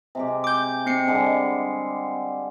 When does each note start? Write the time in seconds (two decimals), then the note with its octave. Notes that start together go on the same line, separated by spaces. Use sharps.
0.15 C3 G#3 G4
0.44 D6 G6
0.86 C4 C7 C#7
1.08 D3 G3 G#3